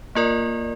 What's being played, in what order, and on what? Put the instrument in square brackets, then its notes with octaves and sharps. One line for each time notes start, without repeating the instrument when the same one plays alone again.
[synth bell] A#3 F4 A#4 D5